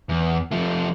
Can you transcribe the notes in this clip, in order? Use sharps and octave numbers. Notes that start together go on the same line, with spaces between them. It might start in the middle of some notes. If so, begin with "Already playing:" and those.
E2
F3 A3